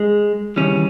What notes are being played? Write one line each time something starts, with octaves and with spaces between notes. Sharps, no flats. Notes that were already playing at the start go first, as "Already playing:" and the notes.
Already playing: G#3
D#2 C#3 E3 G3 C#4